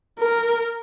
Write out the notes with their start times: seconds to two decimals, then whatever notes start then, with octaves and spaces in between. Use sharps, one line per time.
0.19 A#4